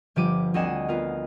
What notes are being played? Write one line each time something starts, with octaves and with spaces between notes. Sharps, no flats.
G1 F3 G4 D6 D#7
D2 C4 D#5 F#5 G#5 E7
B3 F4 A#4